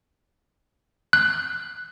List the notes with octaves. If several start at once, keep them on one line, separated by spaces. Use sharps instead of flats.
F#6